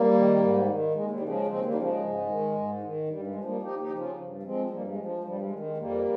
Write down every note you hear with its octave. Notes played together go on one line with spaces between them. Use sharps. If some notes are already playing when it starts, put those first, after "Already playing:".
Already playing: G3 A#3
D#3
G#2
D#3
D#2 G#3
G3
C#3 F3
G#3
D#2 G#3 C4
G3 A#3
C#3 F3
G#3
G#2
D#3
G#2
D#3
G2 G3
G#3
F3
G3 A#3
D#2 D#4 G4
D#4 G4
C#3 F3
C#4 F4
G2
F3 G#3 C4
G2 G3 A#3
G#3
F3
G#3
G#3
G2 G3
G#3
D#3
G#3
F2 G3 A#3